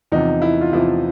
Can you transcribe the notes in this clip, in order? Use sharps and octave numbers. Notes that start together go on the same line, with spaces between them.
E2 C3 F3 D#4
E4
F4
E2 C3 F3 E4